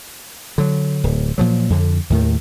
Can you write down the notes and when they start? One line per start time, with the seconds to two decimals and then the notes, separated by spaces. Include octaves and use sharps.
0.58 D3 F#3
1.04 D1
1.38 A#2 F3 F#3
1.70 F2 D3
2.10 D#2 A2 D#3